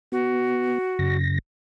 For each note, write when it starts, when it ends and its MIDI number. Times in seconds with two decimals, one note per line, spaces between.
0.12 0.78 59
0.12 1.17 66
0.99 1.39 42
0.99 1.39 49
0.99 1.39 94